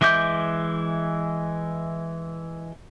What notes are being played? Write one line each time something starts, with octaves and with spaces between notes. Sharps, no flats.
E3 G#3 E5 D6 G6